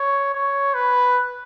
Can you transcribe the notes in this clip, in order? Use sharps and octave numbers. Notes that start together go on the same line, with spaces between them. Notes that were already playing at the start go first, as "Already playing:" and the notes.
Already playing: C#5
C#5
B4